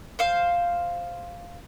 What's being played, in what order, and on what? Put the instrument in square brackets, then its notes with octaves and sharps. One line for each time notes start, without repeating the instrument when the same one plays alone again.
[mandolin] C5 F5